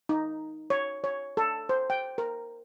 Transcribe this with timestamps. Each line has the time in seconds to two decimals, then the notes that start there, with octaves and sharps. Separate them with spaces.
0.09 D#4
0.70 C#5
1.04 C#5
1.37 A4
1.69 C5
1.90 G5
2.18 A#4